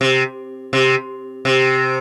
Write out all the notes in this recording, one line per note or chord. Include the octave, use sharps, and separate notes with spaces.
C3
C3
C3